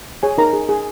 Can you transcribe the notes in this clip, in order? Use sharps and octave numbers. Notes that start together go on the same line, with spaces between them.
G#4 C#5 G#5
D#4 A#4 A#5
G#4
G#4